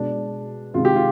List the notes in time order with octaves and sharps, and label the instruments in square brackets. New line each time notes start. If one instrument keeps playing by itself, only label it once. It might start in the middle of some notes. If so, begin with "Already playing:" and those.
Already playing: [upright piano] B2 G#3 D4
C3 D#3 G#3 F4
G4
F4